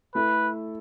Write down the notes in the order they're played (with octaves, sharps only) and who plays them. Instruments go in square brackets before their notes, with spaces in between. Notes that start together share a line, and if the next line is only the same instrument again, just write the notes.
[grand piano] A3 E4 A4 [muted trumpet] B4